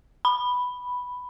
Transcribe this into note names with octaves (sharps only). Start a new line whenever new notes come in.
B5